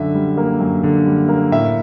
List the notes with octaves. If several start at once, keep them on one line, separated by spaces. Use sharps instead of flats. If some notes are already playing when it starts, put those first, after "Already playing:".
Already playing: F#2 D3 E5
G3
A#3
F#2
D3
G3
A#3
A2 E5